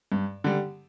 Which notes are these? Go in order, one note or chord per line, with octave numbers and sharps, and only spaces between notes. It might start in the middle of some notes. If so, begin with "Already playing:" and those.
G2
D3 G3